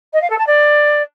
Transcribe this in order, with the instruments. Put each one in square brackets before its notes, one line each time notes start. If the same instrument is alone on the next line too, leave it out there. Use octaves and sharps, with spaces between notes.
[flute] D#5
F5
A4
A5
D5